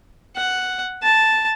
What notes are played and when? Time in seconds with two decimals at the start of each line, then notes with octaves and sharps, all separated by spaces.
0.36 F#5
1.03 A5